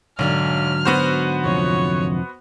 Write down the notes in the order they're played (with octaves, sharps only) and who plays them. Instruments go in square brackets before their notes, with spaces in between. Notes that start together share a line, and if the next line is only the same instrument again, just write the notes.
[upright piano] B1 [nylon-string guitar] G#2 D3 F#3 [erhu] F6
[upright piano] B3 F#4 C5
[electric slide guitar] F2 C3 F3 [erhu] C#5